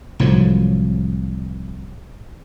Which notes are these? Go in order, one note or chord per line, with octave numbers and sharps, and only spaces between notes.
C2 A2 F3 F#3